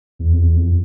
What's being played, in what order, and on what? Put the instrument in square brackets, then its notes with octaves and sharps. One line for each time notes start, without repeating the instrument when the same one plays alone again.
[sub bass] E2
F2
E2
F2